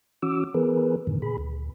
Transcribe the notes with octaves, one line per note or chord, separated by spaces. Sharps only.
E3 C#4 F#4 D6 E6
E3 B3 G#4 A#4 B4
F#2 A2 D3 D#3
A#2 G#4 B5
D2